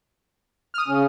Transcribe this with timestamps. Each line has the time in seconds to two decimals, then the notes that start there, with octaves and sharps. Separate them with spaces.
0.74 D#6 F6
0.88 C#3 C#4